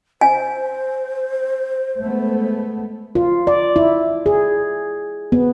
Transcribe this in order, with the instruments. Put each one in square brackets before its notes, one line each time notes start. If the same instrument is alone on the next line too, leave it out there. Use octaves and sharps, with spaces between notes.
[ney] C5 [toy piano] G#5
[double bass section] G#3 A3 B3
[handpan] F4
D5
E4
G#4
B3